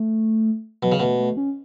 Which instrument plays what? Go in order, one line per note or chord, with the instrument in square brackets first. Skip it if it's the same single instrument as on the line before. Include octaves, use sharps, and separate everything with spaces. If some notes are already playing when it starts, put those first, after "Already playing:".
Already playing: [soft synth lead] A3
[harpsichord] B2 [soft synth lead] F#3
[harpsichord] C#3
[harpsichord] B2 [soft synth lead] A3
[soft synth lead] A3
C#4